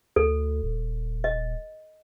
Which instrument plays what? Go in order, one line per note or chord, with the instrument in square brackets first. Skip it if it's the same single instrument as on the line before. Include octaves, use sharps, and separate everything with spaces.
[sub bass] D2 [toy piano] A4
[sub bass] D#1
[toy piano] D#5